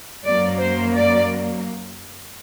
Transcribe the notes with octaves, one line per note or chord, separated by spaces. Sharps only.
F#2 F#3 A#3 D5
C5
D5